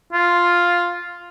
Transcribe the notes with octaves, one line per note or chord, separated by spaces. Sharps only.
F4